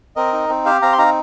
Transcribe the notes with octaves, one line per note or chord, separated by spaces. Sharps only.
C4 A#4 D#5
D#4
C4
G4 C5 F5
C4 F5 A#5
C6
D#4 F5 A#5